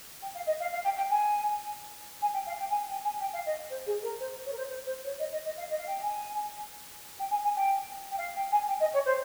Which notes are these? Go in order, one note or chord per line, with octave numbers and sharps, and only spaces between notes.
G5
F5
D#5
F5
F5
G5
G5
G#5
G#5
G5
F5
G5
G#5
G5
G#5
G5
F5
D#5
C5
G#4
A#4
C5
C#5
A#4
C5
C5
C5
C#5
D#5
D#5
D#5
F5
D#5
F5
G5
G#5
G5
G#5
G#5
G5
G5
F5
G5
G#5
G5
D#5
C#5
C5